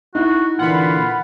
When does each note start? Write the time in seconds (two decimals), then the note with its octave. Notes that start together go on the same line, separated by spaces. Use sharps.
0.15 D#4 E4 F#4
0.59 A#2 D3 E3 F4 F#5 B5